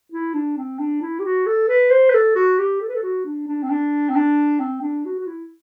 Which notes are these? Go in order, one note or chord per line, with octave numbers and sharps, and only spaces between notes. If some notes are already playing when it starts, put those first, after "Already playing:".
E4
D4
C4
D4
E4
G4
F#4
A4
B4
C5
B4
A4
F#4
G4
A4
B4
A4
F#4
D4
D4
C4
D4
C4
D4
C4
D4
F#4
F#4
E4